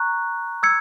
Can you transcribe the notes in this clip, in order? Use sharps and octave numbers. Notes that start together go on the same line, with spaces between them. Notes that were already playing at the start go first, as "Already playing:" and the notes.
Already playing: A#5 C#6 F#6
E6 G#6 C#7